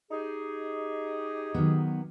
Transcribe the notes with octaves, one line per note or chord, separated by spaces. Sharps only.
D#4 G4 G#4
D#3 F#3 B3